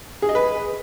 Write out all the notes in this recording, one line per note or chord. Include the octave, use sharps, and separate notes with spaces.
G#4
D#5
B4